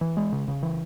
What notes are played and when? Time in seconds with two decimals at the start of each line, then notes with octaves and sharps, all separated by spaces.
0.01 E3
0.17 G#3
0.33 C#3
0.48 C#3
0.63 E3